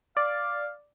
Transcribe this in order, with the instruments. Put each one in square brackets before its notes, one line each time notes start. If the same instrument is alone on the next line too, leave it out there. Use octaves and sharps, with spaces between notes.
[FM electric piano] D5 [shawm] F5